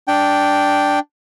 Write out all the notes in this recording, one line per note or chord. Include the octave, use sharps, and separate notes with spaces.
D4 G5